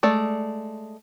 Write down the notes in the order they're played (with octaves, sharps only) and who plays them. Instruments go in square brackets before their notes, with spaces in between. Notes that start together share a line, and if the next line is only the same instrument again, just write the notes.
[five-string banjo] G#3 A3 D5